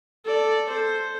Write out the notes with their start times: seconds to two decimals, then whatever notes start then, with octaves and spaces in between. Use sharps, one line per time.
0.25 A4 D5
0.69 A4 C5